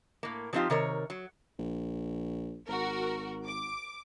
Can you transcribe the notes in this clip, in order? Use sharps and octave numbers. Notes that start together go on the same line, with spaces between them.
A2 A#3
F3 F#3 C4 D#4 F4 G4
C3 D#3 A#4 C#5
F#3
A#1
G#1 F#4 A#4
D6